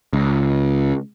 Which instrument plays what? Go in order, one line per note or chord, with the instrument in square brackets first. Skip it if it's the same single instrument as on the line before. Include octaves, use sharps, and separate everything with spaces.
[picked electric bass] C#2